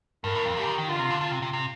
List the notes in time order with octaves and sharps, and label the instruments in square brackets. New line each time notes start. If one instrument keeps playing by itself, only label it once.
[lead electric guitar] G2 [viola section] A#4
[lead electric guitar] A2
F2
[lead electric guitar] G2 [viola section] G4
[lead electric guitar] D#3
D#3
[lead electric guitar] D3 [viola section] F4
[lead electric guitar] C3
D3
D3
C3
C3
C3